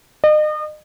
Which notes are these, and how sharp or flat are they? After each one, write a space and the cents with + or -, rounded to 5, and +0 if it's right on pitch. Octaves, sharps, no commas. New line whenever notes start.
D#5 -35